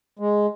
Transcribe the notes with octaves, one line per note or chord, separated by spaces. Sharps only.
G#3